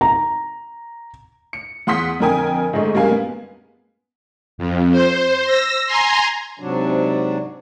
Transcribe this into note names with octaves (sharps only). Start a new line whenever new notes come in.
A#5
C#7
E2 F#5 C6 D#6 B6
F2 D3 A#4 G5 G#5 D#6
G#2 D3 G#3 A3
F#2 G3 G#3 A#3 F5 G#5
B3
F2
C5
E6 A#6
G#5 A#5 C6
G#2 C3 F#3 D4